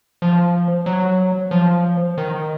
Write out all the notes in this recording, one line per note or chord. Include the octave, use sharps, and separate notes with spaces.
F3
F#3
F3
D#3